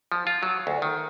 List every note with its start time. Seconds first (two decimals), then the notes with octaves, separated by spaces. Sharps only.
0.12 F3
0.27 F4
0.43 F#3
0.67 D2
0.82 D#3